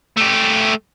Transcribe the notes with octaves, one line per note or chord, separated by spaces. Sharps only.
A3 G4